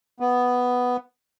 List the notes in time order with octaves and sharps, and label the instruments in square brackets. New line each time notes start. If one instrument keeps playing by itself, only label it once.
[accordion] B3